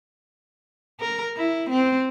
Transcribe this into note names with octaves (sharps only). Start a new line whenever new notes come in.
A#4
E4
C4